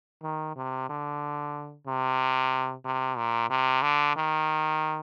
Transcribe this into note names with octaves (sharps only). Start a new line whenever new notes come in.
D#3
C3
D3
C3
C3
A#2
C3
D3
D#3